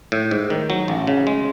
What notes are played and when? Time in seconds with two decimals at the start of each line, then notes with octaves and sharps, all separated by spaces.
0.12 A2
0.31 G#2
0.50 D#3
0.70 F#3
0.88 A1
1.07 C#3
1.27 G#3